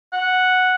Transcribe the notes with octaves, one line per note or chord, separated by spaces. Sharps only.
F#5